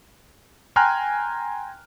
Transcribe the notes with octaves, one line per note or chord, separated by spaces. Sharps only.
G5 G#5 A#5 C6 F6 F#6